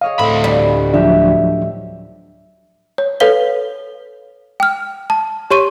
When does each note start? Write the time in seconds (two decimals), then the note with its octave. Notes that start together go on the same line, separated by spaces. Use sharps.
0.01 G#4 C#5 D#5 F5
0.19 D2 A2 C4 B5
0.44 G3
0.94 F3 F#3 D4 F#4 G4 E5
2.98 C#5
3.20 A4 B4 C#5 F5 G7
4.60 G5 F6
5.10 A5
5.51 G4 C#5 C6 C#6 D#7